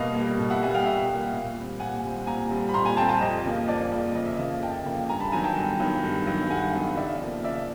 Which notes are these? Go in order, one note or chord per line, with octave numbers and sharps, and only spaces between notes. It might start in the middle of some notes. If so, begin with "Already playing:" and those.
Already playing: B2 G3 A#3 D#5 F5
A#3
G3
B2
E5 F#5
G3 A#3 F#5 G#5
F5 G5
B2 E5 F#5
G3 A#3
A#2
G3 C4
A#2 F#5 G#5
G3 C4
A#2 G#5 A#5
G3 C4
B5
A#2 A#5 C6
G#5 A#5
G3 C4 G5 A5
G5 A5
F2 D#5
C#3 F3 A#3
F2 D5
C#3 F3 A#3
F2 D#5
E5
D#5
C#3 F3 A#3
F2 G5 A5
C#3 F3 A#3
G2 G#5 A#5
A5 B5
D#3 F#3 B3 G#5 A#5
G5 A5
G2
D#3 F#3 B3
G2
D#3 F#3 B3
G2 F#5 G#5
D#3 F#3 B3
C#3 D5 E5
F3 A#3
C#3 D5 E5